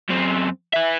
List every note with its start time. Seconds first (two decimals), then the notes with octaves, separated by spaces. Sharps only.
0.09 F#2 C4
0.74 B4 E5